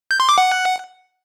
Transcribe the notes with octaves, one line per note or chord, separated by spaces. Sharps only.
G6
C6
D6
F#5